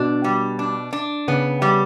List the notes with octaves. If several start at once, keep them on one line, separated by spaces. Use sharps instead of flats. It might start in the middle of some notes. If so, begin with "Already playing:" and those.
Already playing: B2 D4
G3
D4
D4
C#3 B3
G3